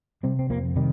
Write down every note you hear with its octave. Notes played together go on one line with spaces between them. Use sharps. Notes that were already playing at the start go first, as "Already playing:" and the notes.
C3 G3 C4
C4
F2 F3 A#3
C3 D#3 G3